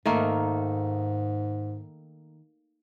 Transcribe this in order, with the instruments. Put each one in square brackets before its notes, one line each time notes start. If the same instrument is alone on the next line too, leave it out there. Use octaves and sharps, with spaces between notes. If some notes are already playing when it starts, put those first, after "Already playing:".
[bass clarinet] G#2 [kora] D#3 A3 A#3